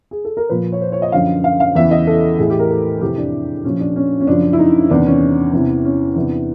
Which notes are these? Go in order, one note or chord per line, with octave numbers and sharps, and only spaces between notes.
G#4
A4
A#4
A#2 F3 B4
C#5
C5
C#5
D#5
F#2 D3 F3 F5
F5
F5
E2 C#3 E3 E5
D#5
A4
A2 E3 G#4
G4
A#4
A4
F2 C3 E3 G4
D4
A#2 F3 C#4
D4
C#4
C#4
F#2 C#3 F3 D4
E4
D#4
E2 C3 D#3 D4
C#4
E2 C3 E3
C#4
E2 C3 E3 D4